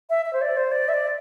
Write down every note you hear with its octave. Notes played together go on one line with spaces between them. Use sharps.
E5
E5
C5
D5
C5
D5
E5
D5